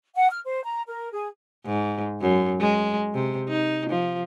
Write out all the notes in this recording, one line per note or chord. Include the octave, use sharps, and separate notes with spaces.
F#5
F6
C5
A#5
A#4
G#4
G#2
F#2
G#3
C3
D#4
F3